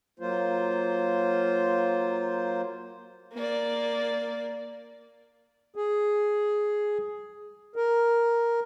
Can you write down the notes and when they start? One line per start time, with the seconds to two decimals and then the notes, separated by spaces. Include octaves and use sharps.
0.20 F#3 A#3 F4 C5
3.34 A#3 D5
5.76 G#4
7.76 A#4